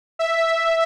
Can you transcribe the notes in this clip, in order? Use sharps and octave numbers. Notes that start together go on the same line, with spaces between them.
E5